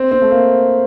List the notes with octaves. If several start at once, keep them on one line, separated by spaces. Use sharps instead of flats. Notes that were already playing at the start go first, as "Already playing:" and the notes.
Already playing: C4
C4
A3
A#3